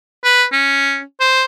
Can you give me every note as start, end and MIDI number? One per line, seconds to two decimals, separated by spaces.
0.24 0.45 71
0.53 1.01 61
1.20 1.45 72